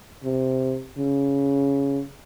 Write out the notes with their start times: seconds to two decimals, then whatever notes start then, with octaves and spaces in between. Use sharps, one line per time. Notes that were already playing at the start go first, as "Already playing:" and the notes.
0.24 C3
0.98 C#3